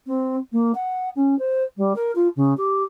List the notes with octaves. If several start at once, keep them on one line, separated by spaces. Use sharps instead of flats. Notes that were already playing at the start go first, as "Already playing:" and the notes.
C4
A#3
F#5
C#4
C5
G3
A#4
F4
C#3
G4